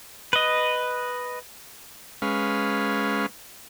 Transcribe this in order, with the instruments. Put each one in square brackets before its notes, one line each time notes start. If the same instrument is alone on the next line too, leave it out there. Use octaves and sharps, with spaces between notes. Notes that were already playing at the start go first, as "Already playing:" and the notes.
[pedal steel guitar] B4 D#5
[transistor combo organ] G#3 C#4 B4 F5